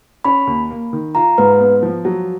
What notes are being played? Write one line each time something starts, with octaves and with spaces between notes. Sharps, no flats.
C#4 B5
D#2
A#3
D#3
F4 A#5
G#2 B4
B3
F3
F#3